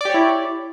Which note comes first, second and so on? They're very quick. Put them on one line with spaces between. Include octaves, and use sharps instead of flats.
D5 G4 C#5 E4